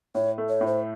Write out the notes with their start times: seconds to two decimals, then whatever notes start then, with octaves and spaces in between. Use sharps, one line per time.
0.15 A2 C#5
0.38 A3
0.49 C#5
0.61 A2
0.67 C5